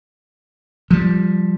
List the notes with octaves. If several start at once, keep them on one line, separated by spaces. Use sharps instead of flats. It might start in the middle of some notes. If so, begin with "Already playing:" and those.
F3 G3